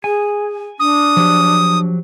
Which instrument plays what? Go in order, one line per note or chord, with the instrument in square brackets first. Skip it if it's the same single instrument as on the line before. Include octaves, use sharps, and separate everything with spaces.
[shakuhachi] G#4 [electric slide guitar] G#5
[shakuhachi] D4 [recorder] D#6
[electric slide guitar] F3 F#3 G4